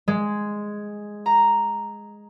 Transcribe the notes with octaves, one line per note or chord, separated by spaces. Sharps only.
G#3
A#5